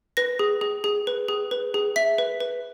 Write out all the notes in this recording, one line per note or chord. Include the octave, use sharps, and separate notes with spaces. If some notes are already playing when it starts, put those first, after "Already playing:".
B4 A#6
G#4
G#4
G#4
B4
G#4
B4
G#4
E5 B6
B4
B4